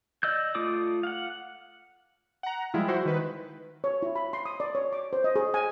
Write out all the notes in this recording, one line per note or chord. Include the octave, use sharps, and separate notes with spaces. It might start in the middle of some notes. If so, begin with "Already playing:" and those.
D5 D#5 E6 G6
A3 F4 D5 D6 D#6
F5 F#5
F#5 A#5
F3 G3 G#3 E4 F4
E4 F#4 C5
D#3 B4
C#5
E4
B5
C6
D#6
D5
C#5
D6
C5
D#5
G#4
G#5